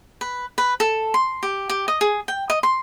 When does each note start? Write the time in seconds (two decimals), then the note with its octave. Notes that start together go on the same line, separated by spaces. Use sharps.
0.21 B4
0.58 B4
0.80 A4
1.14 C6
1.43 G4
1.69 G4
1.88 D#5
2.01 G#4
2.28 G5
2.50 D#5
2.63 C6